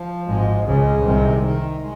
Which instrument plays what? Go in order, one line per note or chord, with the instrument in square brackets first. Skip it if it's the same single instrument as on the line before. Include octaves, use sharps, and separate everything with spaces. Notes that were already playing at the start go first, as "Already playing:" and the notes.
Already playing: [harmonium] F3
[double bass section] G#1 G#2 [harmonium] G#3
[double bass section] C#2 C#3 [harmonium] G#3
[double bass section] C2 C3 [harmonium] D#3
[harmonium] D#3
G#3